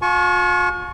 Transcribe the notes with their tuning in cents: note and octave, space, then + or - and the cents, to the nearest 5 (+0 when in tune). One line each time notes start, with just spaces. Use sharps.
F4 +45 A5 -45 C#6 +0